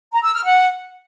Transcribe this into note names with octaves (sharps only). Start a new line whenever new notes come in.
A#5
E6
F6
F#5